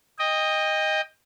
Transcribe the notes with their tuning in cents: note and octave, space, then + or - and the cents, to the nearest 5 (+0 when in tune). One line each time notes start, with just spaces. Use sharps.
D#5 +0 G5 +30